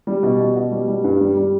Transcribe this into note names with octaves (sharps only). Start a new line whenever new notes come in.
G3
B2
B2
B2
G3
G3
G2
G3
G3